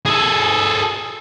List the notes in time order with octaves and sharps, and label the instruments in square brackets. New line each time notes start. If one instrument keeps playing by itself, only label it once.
[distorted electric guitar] G#4 A4